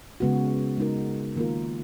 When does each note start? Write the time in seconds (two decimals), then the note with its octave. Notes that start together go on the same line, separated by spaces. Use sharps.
0.20 C#3 G#3 B3 F#4
0.78 G#3 D#4 F#4 A#4
1.36 D#3 A#3 F4 A#4